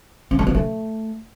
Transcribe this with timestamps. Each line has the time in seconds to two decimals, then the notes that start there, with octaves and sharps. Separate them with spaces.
0.31 C4
0.39 A3
0.47 B3
0.55 A3